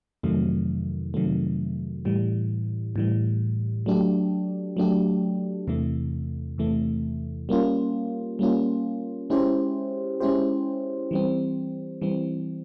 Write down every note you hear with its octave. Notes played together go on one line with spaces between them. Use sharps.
F2 C3 D#3 F#3 A3
F2 C3 D#3 F#3 A3
A2 E3 G3
A2 E3 G3
F#3 A3 D4 G4
F#3 A3 D4 G4
E2 C3 E3 A3
E2 C3 E3 A3
G3 A#3 C#4 F4
G3 A#3 C#4 F4
G#3 C#4 E4 G4 C5
G#3 C#4 E4 G4 C5
E3 G3 C4
E3 G3 C4